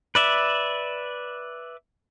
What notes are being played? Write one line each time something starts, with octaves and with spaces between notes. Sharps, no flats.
B4 D5 E5